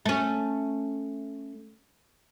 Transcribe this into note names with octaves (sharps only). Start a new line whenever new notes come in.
A3 C#4